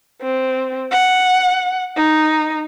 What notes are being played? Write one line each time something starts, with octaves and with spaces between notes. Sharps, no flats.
C4
F#5
D#4